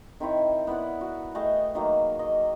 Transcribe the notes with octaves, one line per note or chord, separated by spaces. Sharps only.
D#3 C4 E4 C#5
B3 E4 D5 F#5
F#4
A3 G#4 D#5 G5
D#3 F#3 A#3
D#5